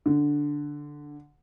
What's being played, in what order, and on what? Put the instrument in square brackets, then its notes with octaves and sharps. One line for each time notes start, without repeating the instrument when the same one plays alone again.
[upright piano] D3